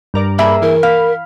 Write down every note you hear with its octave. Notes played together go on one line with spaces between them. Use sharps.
G2 A#4 D5
A#3 G#4 E5 B5
E3 A#4
F5 B5